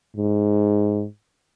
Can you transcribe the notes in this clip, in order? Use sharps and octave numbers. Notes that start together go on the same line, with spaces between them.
G#2